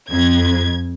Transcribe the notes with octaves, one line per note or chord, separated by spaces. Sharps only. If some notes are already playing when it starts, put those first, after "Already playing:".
F2 G#6